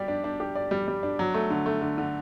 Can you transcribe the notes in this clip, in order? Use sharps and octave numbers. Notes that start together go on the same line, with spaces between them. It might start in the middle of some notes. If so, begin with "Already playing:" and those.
Already playing: G3 G4 D5
D4
D4
G4
D5
G3
G3
D4
F#3
A3
D3
A3
D3
D3